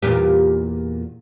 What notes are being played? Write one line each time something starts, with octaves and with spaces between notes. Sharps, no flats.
E2 A#2 G4